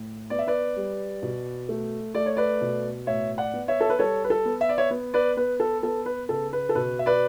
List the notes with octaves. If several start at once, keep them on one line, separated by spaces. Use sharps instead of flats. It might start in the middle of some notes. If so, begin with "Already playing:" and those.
Already playing: A2
B3 D5
E5
B4 D5
G3
B2
A3
A3 D5
C#5
B4 D5
B2
A2 C#5 E5
D5 F#5
B3
C#5 E5
A4
B4
G3 A4 C#5
B4
A4
B3
E5
D5
C#5 E5
B3
B4 D5
B3 B4
A4
B3 A4
B4
C#3 A4
B4
A4
B2 B4
E5
B4 D5